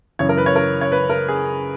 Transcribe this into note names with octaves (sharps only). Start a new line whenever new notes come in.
F#2 C#3 E3 C#5
A#4
B4
C#5
A#4
C#5
B4
A#4
G#4